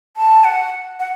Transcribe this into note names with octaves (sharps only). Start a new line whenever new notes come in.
A5
F#5
F#5